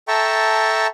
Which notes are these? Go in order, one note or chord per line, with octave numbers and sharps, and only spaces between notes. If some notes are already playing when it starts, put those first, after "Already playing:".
A4 E5 G5 A5 A#5 C#6